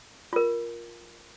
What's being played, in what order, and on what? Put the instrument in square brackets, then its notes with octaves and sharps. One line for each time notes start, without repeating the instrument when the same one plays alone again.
[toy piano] F4 A#4